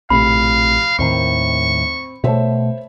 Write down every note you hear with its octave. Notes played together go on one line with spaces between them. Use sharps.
A#1 A2 C3 F5 B5
D#2 A2 D#3 C4 C#6
B2 A3 C5 C#5 E5